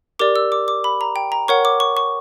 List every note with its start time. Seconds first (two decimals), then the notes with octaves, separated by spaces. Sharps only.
0.19 G4 A#4 D5 D6
0.36 E6
0.52 D6
0.68 D6
0.84 B5
1.01 A#5
1.16 G5
1.32 A#5
1.48 A#4 C#5 F#5 C#6
1.65 D6
1.80 C#6
1.97 C#6